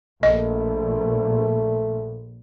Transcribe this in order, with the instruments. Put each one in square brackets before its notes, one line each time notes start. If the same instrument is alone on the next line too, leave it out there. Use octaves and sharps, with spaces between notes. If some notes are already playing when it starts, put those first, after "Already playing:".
[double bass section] A#1 [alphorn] A3 [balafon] D#5